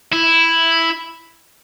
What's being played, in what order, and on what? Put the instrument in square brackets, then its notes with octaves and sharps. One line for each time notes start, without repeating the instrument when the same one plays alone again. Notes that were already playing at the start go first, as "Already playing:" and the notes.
[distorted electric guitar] E4